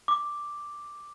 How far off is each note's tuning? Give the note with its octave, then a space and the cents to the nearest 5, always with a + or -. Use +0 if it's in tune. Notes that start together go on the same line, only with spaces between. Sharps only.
D6 +0